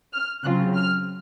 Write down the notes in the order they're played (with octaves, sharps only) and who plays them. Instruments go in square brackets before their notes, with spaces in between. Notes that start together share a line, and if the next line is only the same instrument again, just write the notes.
[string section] F6
C#3 F#3 C4 F4 F#6
F6